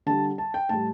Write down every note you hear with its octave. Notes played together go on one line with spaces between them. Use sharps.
D3 G3 A5
A5
G5
A2 G3 A5